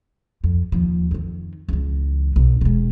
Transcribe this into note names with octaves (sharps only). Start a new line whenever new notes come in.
F2
D#2 F3
F2 D#3
C#2 E3
B1
E1 G#3